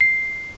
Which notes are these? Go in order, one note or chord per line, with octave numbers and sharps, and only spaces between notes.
C7